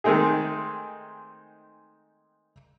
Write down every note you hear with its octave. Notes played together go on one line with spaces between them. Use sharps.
D#3 G#3 A3 C4 D#4 G#4